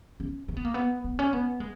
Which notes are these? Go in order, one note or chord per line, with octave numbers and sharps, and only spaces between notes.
C#4
C#4
B3
A#3
B3
B3
C#4
B3
G#3